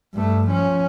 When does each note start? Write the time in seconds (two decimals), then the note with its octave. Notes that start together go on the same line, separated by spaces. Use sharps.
0.14 G2 A3
0.47 F3 C#4